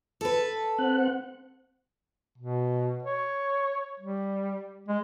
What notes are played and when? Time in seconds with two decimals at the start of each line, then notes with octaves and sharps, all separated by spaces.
0.21 A4 B4
0.78 C4 F#5
2.38 B2
3.03 C#5
4.00 G3
4.88 G#3